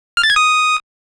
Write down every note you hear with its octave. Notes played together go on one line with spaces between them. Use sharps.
F6
A6
G#6
D#6